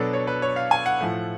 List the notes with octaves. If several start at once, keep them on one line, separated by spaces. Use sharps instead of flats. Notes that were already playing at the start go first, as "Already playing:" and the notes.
Already playing: B2 F#3 B3 D4 A4
C#5
B4
C#5
F5
G#5
F#5
A2 F3 A3